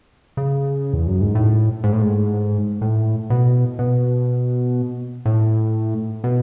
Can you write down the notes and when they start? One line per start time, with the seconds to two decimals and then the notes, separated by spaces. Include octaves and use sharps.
0.37 C#3
0.93 E2
1.07 F#2
1.21 G#2
1.35 A2
1.84 G#2
1.93 A2
2.02 G#2
2.81 A2
3.30 B2
3.79 B2
5.26 A2
6.24 B2